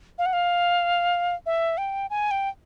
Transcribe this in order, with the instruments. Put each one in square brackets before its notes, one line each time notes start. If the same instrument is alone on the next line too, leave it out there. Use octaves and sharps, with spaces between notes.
[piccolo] F5
F#5
F5
E5
G5
G#5
G5